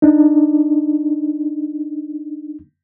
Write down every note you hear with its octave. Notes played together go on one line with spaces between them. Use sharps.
D4 D#4